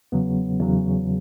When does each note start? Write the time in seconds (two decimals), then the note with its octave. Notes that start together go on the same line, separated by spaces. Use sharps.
0.12 E2 C#3 F#3 B3
0.60 E2 C#3 F#3